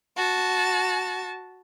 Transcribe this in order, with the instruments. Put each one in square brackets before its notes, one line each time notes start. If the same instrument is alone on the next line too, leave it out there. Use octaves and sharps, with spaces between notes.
[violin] F#4 A5